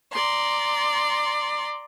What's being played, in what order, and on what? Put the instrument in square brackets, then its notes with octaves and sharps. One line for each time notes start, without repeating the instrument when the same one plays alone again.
[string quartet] D5 A#5 C6